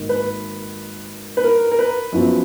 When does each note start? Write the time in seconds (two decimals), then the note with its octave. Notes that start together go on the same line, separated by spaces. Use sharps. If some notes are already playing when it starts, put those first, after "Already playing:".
Already playing: G#1 G#2 D#3 A#3
0.09 B4
1.37 B4
1.44 A#4
1.72 A#4
1.79 B4
2.12 F#2 F3 B3